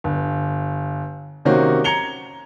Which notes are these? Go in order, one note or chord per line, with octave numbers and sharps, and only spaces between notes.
G1
C3 D#3 A#3 C#4 F#4 C5
A#5 G#6 C#7 F7 G7